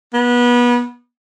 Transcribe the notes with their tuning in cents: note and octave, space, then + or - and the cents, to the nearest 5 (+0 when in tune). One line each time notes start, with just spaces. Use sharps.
B3 -25